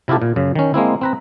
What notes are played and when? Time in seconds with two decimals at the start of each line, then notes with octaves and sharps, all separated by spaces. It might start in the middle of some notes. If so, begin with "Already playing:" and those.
0.08 C3 E4 F4 G4 A4
0.22 A#2
0.36 F#2 C#3
0.55 D#3 C#4
0.74 G#3 A#3 C4 E4
1.01 C4 B4 A#5